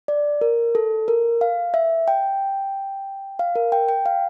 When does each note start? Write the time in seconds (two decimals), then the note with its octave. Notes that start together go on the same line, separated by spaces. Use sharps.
0.08 D5
0.41 A#4
0.75 A4
1.08 A#4
1.41 F5
1.74 E5
2.08 G5
3.39 F5
3.55 A#4
3.72 G5
3.88 G5
4.06 F5